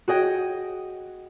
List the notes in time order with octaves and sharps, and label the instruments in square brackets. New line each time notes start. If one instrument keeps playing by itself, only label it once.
[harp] F#4 G#4 D#5 G5